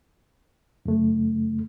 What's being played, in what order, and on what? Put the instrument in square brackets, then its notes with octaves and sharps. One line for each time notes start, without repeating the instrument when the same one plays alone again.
[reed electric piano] F#2 C#3 A3